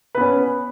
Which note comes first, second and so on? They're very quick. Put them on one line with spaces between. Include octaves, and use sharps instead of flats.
B4 B3 C#4